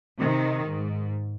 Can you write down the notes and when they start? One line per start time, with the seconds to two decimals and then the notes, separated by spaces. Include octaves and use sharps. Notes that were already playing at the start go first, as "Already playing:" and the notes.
0.20 C3 D#3
0.67 G#2